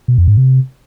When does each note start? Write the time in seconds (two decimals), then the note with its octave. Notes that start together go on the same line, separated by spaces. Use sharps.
0.08 B2
0.18 F2
0.28 G#2
0.37 C3